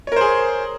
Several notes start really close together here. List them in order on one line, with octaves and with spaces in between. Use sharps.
C#5 A#4 C5 G#4